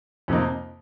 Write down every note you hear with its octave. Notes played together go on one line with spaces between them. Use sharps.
F2 C3 F3 A#3 D#4